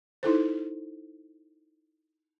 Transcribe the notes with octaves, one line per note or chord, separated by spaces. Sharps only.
D#4 E4 A4 C5